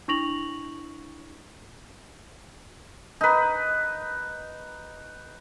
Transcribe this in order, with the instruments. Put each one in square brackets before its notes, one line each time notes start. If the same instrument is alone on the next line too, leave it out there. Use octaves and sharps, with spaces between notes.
[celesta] D4 E4 C#6 A#6 F7 F#7
[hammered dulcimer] D#4 B4